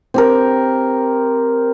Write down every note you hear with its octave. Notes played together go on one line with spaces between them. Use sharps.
C4 G4 A#4